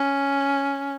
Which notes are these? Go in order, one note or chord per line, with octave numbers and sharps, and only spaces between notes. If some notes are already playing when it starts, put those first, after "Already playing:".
Already playing: C#4